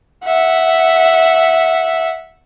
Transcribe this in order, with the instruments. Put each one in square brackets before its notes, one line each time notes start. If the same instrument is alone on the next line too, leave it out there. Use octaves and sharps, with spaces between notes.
[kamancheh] E5 F#5